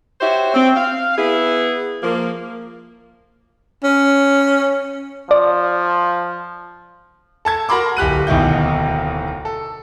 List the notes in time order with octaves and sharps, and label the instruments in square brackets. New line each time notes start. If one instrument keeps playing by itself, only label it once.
[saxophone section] F#4 G4 C5 C#5 E5
C4
F5
B3 E4 G#4
F3 A#3
[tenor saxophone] C#4
[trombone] F3 [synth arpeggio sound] D5
[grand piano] A4 A5 G#6
F#4 A#4 B5 C6 D6
D1 G4 F#6 D#7
D1 D#2 B2 D#4 E4 G6
A4